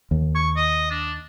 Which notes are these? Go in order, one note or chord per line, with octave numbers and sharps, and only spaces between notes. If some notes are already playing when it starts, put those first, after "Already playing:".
D#2
C#6
D#5
D4